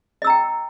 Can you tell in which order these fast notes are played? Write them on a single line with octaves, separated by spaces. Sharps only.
D#5 E6 A#5 G5